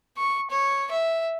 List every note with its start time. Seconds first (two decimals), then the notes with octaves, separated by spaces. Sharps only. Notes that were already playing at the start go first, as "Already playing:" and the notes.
0.17 C#6
0.51 C#5
0.91 E5